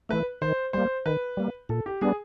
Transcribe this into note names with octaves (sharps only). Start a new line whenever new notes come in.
E3 A3 B4
D#3 C5
G3 A#3 C5
D#3 B4
G3 A#3
A#2 A4
G4
G3 B3 D4 G#4